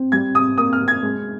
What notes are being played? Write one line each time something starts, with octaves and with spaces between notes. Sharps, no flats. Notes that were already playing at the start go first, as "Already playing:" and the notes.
Already playing: C4
G3 G#6
C3 D#6
A#3 D#6
F6
C3
G#6
G#3